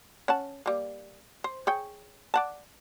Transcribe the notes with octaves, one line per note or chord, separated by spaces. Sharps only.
C#4 F#5 A5
G3 A#3
C5
G#4 C#5 G5
D5 F#5 A5